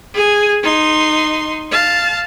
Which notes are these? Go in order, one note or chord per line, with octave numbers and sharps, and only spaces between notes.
G#4 G#5
D#4 C6
F5 A5